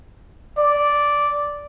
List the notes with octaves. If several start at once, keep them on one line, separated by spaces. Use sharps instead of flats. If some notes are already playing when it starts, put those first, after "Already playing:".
D5